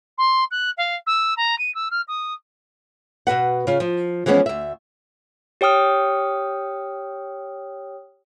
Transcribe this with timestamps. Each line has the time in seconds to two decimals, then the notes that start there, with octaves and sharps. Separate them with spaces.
0.18 C6
0.51 F#6
0.77 F5
1.06 E6
1.37 A#5
1.58 D#7
1.74 E6
1.91 F6
2.08 D#6
3.27 B2 F#4 B4 F#5
3.67 C#3 F4
3.80 F3
4.26 E3 F3 G#3 B3 C#4
4.46 D2 E5
5.61 G4 C#5 G5 D#6 F6